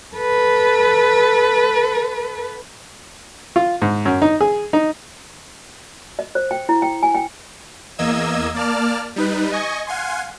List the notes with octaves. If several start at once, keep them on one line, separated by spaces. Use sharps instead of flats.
A4 B4
F4
G#2
F#2
D#4
G#4
D#4
D#5
C5
G5
E4
G5
G#5
G5
E2 A#3 D#5 E6 G#6
A#3 D5 A5 F6
G3 D#4 B4
D#5 G#5 C#6
F5 F#5 G#5 C6